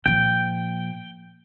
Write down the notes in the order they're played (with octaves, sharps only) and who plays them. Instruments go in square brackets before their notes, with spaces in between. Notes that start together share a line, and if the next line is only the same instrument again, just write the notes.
[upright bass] A#2 F3 [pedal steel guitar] G5